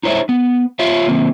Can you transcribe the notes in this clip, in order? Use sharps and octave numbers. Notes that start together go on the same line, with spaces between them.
D#4 E4 C5 C#5 E5
B3
F4 C#5 E5 F5
D#3 A#3 C4